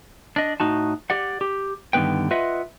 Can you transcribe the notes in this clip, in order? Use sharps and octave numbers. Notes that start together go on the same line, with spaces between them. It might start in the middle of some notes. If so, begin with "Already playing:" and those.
D4 D#5
A2 D#4 F#4 A5
G4 D5 F#5
G4
G2 D3 D#3 B3 B4 G5
F4 B4 D#5 E5 F#5